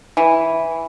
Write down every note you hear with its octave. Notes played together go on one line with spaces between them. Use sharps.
E3